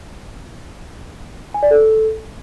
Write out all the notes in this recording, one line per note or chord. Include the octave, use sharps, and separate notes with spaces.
G#5
D5
A4